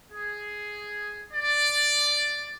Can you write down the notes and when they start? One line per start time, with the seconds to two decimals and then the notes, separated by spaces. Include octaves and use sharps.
0.13 G#4
1.33 D5